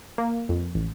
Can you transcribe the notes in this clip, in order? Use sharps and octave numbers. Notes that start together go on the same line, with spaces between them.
A#3
F2
A1